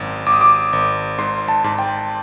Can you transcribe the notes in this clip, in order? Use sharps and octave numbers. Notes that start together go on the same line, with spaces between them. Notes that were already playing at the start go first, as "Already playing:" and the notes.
Already playing: G#1 F#2
G#1 D6
D#6
D6
G#1
G#2 C6
A5
G#2
G5